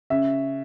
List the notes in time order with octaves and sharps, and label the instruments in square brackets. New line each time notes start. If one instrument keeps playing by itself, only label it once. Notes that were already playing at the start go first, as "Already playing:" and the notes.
[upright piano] C#3 E5